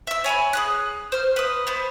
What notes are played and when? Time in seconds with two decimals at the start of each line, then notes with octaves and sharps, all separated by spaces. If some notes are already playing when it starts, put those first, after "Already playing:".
0.07 E5 E6
0.24 C#5 G#5 A5 B5
0.53 G#4 D#6 F#6
1.12 C5 F6
1.36 B4 D#6
1.67 B3 C5